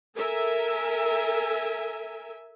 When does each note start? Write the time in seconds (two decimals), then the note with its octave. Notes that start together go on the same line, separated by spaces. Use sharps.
0.15 A4 A#4 E5 G#5